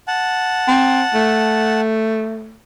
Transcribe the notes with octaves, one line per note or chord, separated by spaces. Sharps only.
F#5 A5
C4
A3